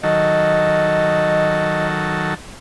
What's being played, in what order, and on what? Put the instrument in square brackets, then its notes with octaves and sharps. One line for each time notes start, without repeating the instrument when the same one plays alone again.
[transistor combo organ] D#3 F#3 A4 [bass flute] D#5